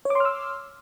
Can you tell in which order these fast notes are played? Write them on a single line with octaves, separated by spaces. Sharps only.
C#5 D6 C6 F6 E6